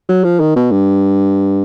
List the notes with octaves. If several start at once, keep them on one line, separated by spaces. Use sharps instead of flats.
F#3
F3
D#3
B2
G2